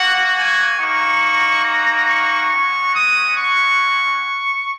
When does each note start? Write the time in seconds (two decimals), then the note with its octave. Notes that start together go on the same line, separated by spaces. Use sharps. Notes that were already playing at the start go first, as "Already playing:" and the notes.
Already playing: A#3 F#4 F#5
0.35 G#5
0.78 A#3 D#4 F#4 C#6
1.65 A#5
2.08 C#6
2.51 G#3 C#4 F#4
2.94 D#6
3.38 C#6